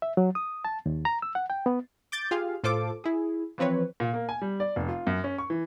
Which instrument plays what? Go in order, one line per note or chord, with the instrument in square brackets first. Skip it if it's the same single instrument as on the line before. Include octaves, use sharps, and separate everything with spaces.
[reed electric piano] E5
F#3
D#6
A5
D#2
A#5
E6
F#5
G5
B3
[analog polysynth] D6 G6 A6
F4 G4 G#4 F5
A2 F4 A4 C5 D6
E4 G#4
E3 F3 C4 B4 C#5
[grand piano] A#2
A#3
G#5
G3
D5
F1
F4
F#2
C#4
C#6
E3